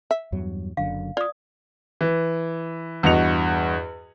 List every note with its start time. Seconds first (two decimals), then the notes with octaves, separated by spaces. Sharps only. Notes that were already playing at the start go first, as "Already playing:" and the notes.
0.11 E5
0.32 E2 G2 F#3
0.77 F#1 F#2 D3 F5
1.17 F4 D5 D#6
2.01 E3
3.03 E2 G2 F#4 D#5 C#7 F7